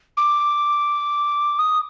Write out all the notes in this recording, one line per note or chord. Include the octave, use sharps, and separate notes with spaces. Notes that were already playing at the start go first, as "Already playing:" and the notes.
D6
D#6